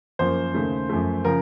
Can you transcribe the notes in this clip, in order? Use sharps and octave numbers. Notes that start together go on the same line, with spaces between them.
F#2 F3 A#3 C5
D#2 C#3 A3
F#2 F3 A3
C#3 F3 A#4